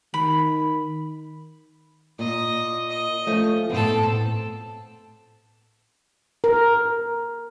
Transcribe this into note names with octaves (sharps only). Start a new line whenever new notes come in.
D#3 B5
A#2 D#5
D#5
F3 A3 C#4
A2 B3 C4 A4
A#4